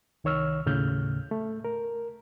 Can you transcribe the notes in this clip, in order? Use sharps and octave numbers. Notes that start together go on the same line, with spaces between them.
C2 D#3 C#5 E6 F6
D#2 A2 C#3 F6 G6
A3
A#4